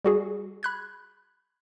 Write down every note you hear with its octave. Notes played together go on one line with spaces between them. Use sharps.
G3 F#4 G#4
B5 F#6 G#6